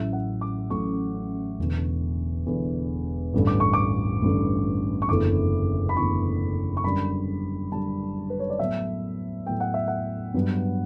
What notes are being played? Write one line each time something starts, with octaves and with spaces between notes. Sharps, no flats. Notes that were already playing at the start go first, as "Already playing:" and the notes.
Already playing: A1 A2 F#3 C#4 E4 E5
F#5
D6
A1 A2 F#3 C#4 E4 C#6
E1 E2 D3
E1 E2 D3
A1 G2 D3
D6
C#6
D6
A1 G2 D3
C#6
F#1 E2 D3 A3 E4 D6
B5
F#1 E2 D3 A3 E4 C#6
C#6
F#2 D3 G3 D4 B5
F#2 D3 G3 D4 A5
B4
C#5
D5
A2 F#3 B3 E5
A2 F#3 B3 G5
F#5
E5
F#5
G2 F#3 B3